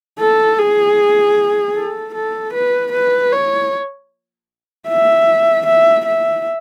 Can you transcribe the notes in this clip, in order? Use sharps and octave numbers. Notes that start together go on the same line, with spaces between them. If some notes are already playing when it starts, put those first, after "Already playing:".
A4
G#4
A4
A4
B4
B4
C#5
E5
E5
E5